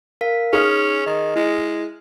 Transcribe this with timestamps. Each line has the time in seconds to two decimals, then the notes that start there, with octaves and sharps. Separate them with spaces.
0.21 A#4 F5 B6
0.53 C#4 D#4 G#4 D#6 F6
1.06 D#3 D#5
1.36 G#3 E4